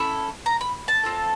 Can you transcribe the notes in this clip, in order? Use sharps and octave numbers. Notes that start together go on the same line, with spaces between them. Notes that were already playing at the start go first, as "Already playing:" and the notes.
Already playing: C#4 E4 A4 B5
A#5
B5
A5
C4 F4 A4